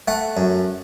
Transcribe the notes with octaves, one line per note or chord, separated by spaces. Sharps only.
A3 F#5
F#2